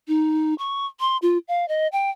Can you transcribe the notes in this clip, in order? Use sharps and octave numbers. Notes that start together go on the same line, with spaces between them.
D#4
C#6
C6
F4
F5
D#5
G5